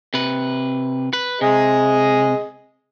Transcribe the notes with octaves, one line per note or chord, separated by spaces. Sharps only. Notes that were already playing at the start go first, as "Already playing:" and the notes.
C3 B4
B4
C3 G#4 D#5